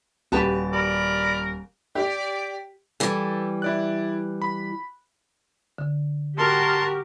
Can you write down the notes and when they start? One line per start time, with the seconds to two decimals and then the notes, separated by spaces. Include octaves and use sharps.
0.32 D#1 F#4 G4 B4 A5
0.73 A#4 D5 B5
1.95 G4 D5
3.00 E3 G3 A4
3.62 E4 D5 F#6
4.42 B5
5.78 D3
6.38 F#4 G4 A#4 A5 C6